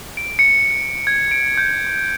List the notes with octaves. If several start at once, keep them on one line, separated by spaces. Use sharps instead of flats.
D7
C#7
G#6
D7
G6